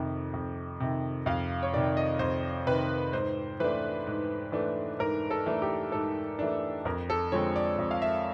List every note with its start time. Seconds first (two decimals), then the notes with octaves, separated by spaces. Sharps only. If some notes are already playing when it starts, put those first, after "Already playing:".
Already playing: F2 C3 D#3
0.33 F2
0.80 C3 D#3
1.26 F2 F5
1.62 C#5
1.73 C3 D#3 D5
1.97 D#5
2.19 F2 C5
2.66 C3 D#3 B4
3.13 G#2 C5
3.60 E3 A3 D4 B4
4.07 G#2
4.52 E3 A3 D4
4.99 G#2 A#4
5.30 A4
5.46 E3 A3 D4
5.62 G4
5.92 G#2 A4
6.39 E3 A3 D4
6.85 F2 A#4
7.10 A4
7.32 D3 F3 G#3 C4 C#5
7.56 D5
7.79 F2
7.91 F5
8.02 E5